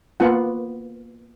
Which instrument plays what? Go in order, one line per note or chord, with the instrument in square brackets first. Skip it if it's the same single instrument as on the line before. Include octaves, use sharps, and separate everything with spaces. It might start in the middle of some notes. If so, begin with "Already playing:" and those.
[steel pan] A#3 B3 F4 F#5